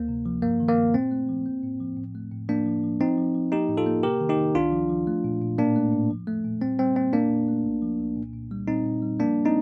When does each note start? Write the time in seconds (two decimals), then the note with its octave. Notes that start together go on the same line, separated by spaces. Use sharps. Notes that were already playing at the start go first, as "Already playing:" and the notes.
Already playing: D2 A#3
0.08 C3
0.26 F3
0.42 G2 A#3
0.60 D#3
0.68 A#3
0.77 G2
0.94 A#2 C4
1.11 A3
1.29 F3
1.46 A#3
1.63 A2
1.80 F3
1.97 A2
2.15 A3
2.31 A2
2.49 F3 A#3 D4
2.66 F3
2.83 F3
3.00 F3 C4 D#4
3.17 F3
3.35 F3
3.52 A#3 D#4 G4
3.69 A2
3.77 F4 A4
3.86 A#3
4.03 C3 G4 A#4
4.21 D#3
4.29 D#4 G4
4.38 D#3
4.55 C2 D4 F4
4.72 F3
4.90 F3
5.07 A3
5.24 A#2
5.41 A#2
5.58 A2 A#3 D4
5.76 A3
5.92 A2
6.10 F3
6.27 A3
6.44 A#2
6.61 G3 C4
6.79 G3 C4
6.95 A#3 C4
7.13 A#2 A#3 D4
7.31 A#2
7.48 A3
7.65 C2
7.82 F3
7.99 C2
8.16 A#2
8.33 A#2
8.51 G3
8.68 A#2 C4 D#4
8.85 A#2
9.02 G3
9.20 F3 A#3 D4
9.45 C4 D#4